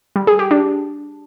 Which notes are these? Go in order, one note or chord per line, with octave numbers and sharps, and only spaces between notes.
G3
G#4
G4
D4